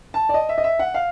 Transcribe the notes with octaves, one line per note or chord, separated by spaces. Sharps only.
A5
D5
D#5
E5
D#5
E5
F#5
F5